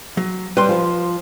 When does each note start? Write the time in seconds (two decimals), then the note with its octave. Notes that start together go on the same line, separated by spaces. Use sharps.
0.17 F#3
0.57 G3 B4 C6
0.69 F3